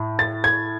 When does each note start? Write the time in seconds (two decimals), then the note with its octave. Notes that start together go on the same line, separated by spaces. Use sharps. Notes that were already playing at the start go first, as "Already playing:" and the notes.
Already playing: A2
0.19 A6
0.44 G#6